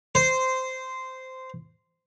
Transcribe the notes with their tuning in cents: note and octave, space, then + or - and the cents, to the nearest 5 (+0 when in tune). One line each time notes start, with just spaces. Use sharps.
C5 -10